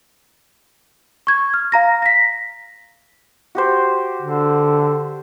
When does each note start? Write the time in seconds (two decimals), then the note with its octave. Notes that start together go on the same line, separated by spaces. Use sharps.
1.27 C#6 G#6
1.54 F6
1.72 F5 A#5 A#6
2.02 A#6 B6
3.55 F#4 G4 C5
4.22 D3